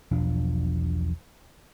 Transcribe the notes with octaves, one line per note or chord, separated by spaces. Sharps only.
E1 B1 F3 D4